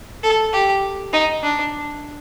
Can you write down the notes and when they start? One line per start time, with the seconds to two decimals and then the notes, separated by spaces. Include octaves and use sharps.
0.23 A4
0.53 G4
1.13 D#4
1.43 D4